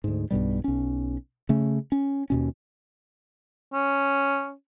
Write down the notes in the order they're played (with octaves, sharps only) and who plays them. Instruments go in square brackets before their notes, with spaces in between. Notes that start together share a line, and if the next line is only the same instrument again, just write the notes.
[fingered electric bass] D2 G#2
B1 G2 B2 G3
B1 C#4
C#3 A3 C#4
C#4
D#2 B2 C#4
[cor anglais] C#4